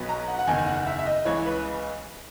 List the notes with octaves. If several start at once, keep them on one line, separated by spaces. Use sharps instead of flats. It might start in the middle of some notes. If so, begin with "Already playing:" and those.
Already playing: B1 B2 F#3 B3
A#5
F#5
F#5
F#1 E2 D#3 G#5
F#5
E5
E5
D#5
C#2 C#3 E3 C#5
B4